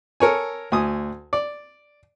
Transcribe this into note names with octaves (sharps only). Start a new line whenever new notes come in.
A4 A#4 C#5 G#5
D2 G#5 D#6
D5